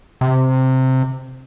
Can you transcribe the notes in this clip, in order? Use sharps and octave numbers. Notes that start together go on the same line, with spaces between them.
C3